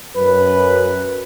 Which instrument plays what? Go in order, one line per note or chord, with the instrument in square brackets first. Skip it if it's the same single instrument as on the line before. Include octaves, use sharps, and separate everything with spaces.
[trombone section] F#2 B4